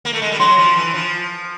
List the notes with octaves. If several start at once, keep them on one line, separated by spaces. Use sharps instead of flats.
A#3
A3
G#3
G3
F#3 C6
F3
E3
F3